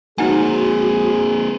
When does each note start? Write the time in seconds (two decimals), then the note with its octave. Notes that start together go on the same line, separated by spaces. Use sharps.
0.18 A#3 C4 D#4 F#4 G#4 F#5 G#5